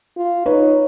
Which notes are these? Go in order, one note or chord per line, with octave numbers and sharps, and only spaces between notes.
F4
D#4 B4 C#5